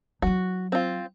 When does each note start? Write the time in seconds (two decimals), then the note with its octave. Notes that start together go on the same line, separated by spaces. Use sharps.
0.22 F#3 E4 F#4
0.72 C4 F4